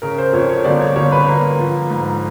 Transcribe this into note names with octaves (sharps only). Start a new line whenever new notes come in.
C#3 A#4
C5
F2 C#5
C#5
G1 D5
C#5
G1 C#5
B4
A#3
F3
G#2